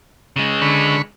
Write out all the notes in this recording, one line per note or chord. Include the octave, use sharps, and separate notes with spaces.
C#3 G#3
D3 B5 C#6